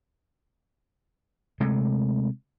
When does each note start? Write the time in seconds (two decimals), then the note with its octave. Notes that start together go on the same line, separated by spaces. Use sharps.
1.60 C3 G#3 A3